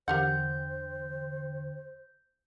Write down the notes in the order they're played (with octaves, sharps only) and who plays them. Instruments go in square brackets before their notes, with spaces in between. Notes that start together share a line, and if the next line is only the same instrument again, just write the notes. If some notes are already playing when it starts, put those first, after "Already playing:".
[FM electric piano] E2 D3 G5 [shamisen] G4 A#4 F#5 [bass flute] C5 [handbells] G6